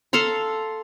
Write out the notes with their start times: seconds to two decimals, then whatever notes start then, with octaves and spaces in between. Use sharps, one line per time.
0.13 A4 F5 A#5 C6